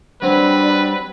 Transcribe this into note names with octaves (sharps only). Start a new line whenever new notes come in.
F#3 G3 C4 D4 B4